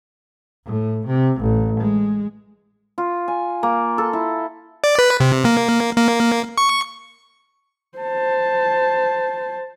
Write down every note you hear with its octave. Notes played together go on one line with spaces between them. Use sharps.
A2
C3
A1
G#3
F4
G#5
A#3
A4
E4
D5
B4
C3
A#3
A#3
C#6
C5 A5